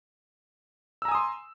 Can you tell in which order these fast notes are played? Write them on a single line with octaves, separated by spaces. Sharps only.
E6 A#5 G#5 D#6 C6